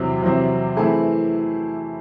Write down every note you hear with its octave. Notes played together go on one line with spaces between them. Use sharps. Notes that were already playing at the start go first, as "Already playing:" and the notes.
Already playing: E2 C3 F#3 C4
E2 C3 F#3 C4
E3 A3 C4 E4 G#4